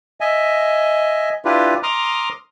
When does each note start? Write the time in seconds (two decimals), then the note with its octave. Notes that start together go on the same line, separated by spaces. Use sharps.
0.21 D#5 E5 G#5
1.45 D4 E4 F4 G4 B4
1.83 A#5 C6 D6 D#6 F6